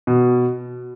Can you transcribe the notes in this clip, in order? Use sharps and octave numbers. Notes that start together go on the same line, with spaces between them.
B2